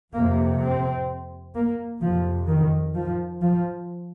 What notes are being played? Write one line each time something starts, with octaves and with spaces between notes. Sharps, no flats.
F2 C3 A#3
C4
A#3
F2 C3 F3
D#3
F3
F3